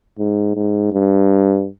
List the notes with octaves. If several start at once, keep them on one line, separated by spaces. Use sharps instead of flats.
G#2
G#2
G2